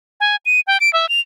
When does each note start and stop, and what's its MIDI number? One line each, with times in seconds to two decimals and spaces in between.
0.20 0.36 80
0.46 0.60 99
0.67 0.78 79
0.80 0.92 98
0.93 1.09 76
1.09 1.20 101